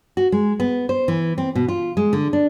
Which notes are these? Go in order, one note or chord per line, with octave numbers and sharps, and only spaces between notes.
F#4
G#3
B3
C5
E3
C4
B2
F4
G#3
D3
D4